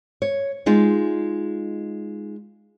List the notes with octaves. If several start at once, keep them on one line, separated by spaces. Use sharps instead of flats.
C#5
G#3 D#4 F4